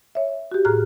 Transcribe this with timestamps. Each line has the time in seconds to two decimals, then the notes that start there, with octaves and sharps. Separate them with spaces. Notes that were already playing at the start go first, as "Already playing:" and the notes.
0.15 C#5 E5
0.52 F#4 G4
0.65 A2 G#4 A#5 F6 F#6